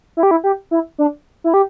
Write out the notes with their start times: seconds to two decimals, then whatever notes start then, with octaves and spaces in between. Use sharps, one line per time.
0.17 E4
0.23 G4
0.31 E4
0.44 G4
0.71 E4
0.98 D4
1.44 E4
1.54 G4